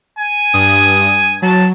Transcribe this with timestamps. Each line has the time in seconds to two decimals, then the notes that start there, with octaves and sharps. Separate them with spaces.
0.19 G#5
0.53 G2 D#6
1.42 F#3 A5